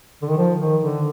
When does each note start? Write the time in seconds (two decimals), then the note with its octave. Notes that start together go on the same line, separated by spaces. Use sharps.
0.22 D3
0.30 D#3
0.38 F3
0.60 D#3
0.83 D3